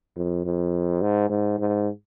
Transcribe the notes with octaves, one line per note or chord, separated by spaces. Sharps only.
F2
F2
G#2
G#2
G#2